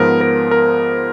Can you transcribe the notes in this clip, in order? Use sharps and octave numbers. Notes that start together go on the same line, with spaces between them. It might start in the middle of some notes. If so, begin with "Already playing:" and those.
Already playing: G#2 F3 B3 A#4
A#4
A#4